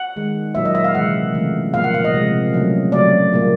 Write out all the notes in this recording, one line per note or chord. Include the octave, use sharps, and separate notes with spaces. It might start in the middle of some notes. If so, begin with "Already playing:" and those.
Already playing: F#5
D#3 G#3
A#2 F#3 A#3 E5
D#5
E5
F5
C3 E3 G#3 F#5
C#3 E3 A3
A#2 F3 A#3 F5
F#5
F5
D#5
C3 F3 G#3
C#3 F#3 A3
C#3 F#3 A3 D5
A#2 G3 A#3